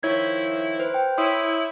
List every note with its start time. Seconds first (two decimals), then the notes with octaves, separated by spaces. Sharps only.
0.03 D#3 F3 E4 C#5 G#6
0.79 B4 C5
0.94 G5
1.17 E4 C#5 C6 D#6